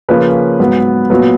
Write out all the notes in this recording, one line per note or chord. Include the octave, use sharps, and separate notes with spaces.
C#3 F3 A#3 C#4 B4
G#2 F#3 B3
A#2 F#3 B3 B4